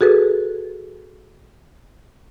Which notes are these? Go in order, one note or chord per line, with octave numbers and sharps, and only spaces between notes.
F#4 G#4 A4 B4